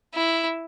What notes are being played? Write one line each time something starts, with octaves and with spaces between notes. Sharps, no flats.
E4